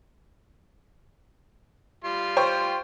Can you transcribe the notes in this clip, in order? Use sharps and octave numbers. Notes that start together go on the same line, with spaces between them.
G3 F4 C6
C5 G5 C#6